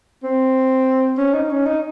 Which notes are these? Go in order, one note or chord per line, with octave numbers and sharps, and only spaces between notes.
C4
C#4
D#4
C#4
D#4